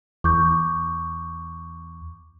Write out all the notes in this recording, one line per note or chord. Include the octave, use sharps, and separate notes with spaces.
E2 C#6 D6 G6